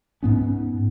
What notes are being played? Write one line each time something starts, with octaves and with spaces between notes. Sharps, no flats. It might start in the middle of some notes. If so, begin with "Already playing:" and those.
G#2 B3 C#4